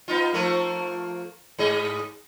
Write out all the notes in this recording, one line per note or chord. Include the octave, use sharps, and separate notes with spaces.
B3 D#4 F4
F3 A3 A#3
G#2 G#4 D#5